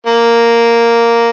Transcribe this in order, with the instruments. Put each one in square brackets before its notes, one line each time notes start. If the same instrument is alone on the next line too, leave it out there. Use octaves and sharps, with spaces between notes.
[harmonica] A#3